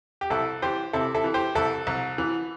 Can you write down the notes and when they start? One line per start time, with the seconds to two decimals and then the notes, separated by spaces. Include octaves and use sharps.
0.21 G4
0.30 C2 E4 A4
0.62 E3 G4 C5
0.93 C3 E4 A4
1.15 E4 A4
1.24 E3
1.34 G4 C5
1.55 C2 E4 A4
1.87 C2
2.18 E3